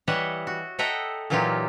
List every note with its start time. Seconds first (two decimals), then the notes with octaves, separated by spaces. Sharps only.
0.08 E3 G3 C#5 D#5 E5 F#5
0.47 F#4
0.79 A4 D#5 E5 F#5 G5 A#5
1.30 A#2 E3 F#3 D#4 F4 G4